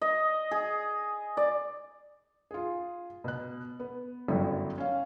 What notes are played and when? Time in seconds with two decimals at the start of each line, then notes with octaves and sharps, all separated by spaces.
0.01 D#5
0.51 G#4
1.37 D5
2.51 F4 G#4
3.24 B2 F#6
3.80 B3
4.28 G1 F#2 F#3 G3 E4 A4
4.78 C#4 F5